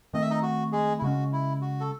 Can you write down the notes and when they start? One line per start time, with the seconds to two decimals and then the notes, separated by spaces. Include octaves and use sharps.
0.14 D#3 A3 C4 D#5
0.22 E5
0.31 D#4 D#5
0.43 F#4
0.72 G#3 G#4
0.99 E4
1.02 C#3 G#3 C#4 F#4
1.32 E4
1.62 F#4
1.80 A4